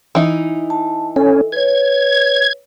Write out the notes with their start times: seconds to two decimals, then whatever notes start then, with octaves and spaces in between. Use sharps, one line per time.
0.15 E3 D#4
0.70 A5
1.16 C#4 A4
1.52 B4 C#5 G#6